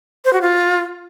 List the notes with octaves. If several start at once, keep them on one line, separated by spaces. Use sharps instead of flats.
C5
F#4
F4